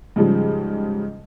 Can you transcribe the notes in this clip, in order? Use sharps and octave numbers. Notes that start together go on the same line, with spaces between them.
G#2 C#3 F3 G3